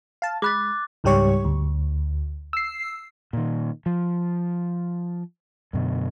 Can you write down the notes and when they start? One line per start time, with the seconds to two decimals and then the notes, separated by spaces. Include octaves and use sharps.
0.22 F5 A5
0.42 G#3 B5 D6 F#6 A6
1.04 C#2 G#2 G3 G4 C#5 C#6
1.45 D2
2.53 E6 C7
3.33 A#2 D#3
3.86 F3
5.73 F#2 B2 D3